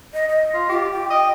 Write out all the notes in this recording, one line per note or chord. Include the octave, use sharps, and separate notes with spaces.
D#5
D#5
F4
F4 G4
G5
D#5